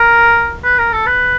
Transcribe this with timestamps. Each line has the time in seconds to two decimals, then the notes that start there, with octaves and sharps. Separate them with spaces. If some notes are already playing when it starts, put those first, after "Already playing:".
Already playing: A#4
0.64 B4
0.78 A#4
0.92 A4
1.06 B4